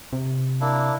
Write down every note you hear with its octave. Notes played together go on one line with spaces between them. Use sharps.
C3
A#3 D4 E4